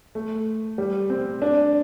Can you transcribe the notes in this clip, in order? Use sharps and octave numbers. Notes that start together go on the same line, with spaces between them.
A3
G3
C4
D4